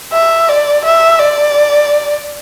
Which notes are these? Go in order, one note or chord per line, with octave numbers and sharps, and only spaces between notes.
E5
D5
E5
D5